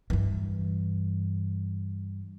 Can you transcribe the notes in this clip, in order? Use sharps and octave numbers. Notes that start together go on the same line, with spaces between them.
G2 E3